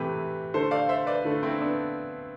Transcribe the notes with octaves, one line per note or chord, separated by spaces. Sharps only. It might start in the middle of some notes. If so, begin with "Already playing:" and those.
Already playing: C3 E3 A3 G4 B4
D3 A3 A4 C5
D5 F5
C5 E5
B4 D5
D3 A3
C4 E4
B3 D4